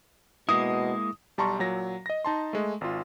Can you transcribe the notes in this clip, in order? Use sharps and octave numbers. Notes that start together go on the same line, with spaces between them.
B2 G#3 A#3 E4 D#6
B1 G3 A5 A#5 C6 C#6
A#2 F#3 A#6
D#5 A#6
D#4 A5 C6
G#3 A3
G#1 F4